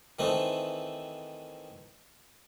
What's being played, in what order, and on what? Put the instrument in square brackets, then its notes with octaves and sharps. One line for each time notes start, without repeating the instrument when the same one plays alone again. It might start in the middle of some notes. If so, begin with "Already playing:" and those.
[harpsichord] D#3 E3 A3 C4